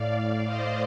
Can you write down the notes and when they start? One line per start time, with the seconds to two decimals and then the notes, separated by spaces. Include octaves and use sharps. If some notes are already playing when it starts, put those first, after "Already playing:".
Already playing: A2 D5 F5
0.46 C5 D#5